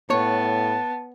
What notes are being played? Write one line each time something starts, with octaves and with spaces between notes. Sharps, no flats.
A2 B3 C#5 A5